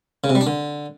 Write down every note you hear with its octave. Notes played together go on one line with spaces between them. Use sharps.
C#3
C3
G3
D4
D3